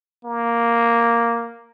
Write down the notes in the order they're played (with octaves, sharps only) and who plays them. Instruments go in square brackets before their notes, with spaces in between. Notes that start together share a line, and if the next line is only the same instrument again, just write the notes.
[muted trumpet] A#3